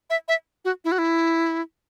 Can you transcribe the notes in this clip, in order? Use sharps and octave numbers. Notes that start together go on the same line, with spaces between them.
E5
E5
F#4
E4
F#4
E4